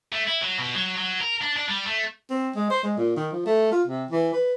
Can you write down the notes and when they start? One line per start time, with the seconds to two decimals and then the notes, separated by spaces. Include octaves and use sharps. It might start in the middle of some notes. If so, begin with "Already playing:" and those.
0.12 A3
0.28 E4
0.41 F#3
0.58 B2
0.75 F#3
0.98 F#3
1.21 A#4
1.42 D4
1.57 D4
1.69 G3
1.87 A3
2.30 C4
2.56 G#3
2.70 C5
2.83 G#3
2.98 A#2
3.16 D#3
3.32 F3
3.46 A3
3.72 F4
3.87 C3
4.11 E3
4.34 B4